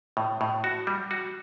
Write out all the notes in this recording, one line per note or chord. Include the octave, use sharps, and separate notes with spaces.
A2
A2
F#4
G3
F#4